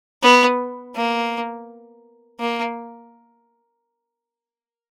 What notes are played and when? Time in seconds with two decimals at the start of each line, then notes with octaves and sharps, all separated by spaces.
0.22 B3
0.95 A#3
2.39 A#3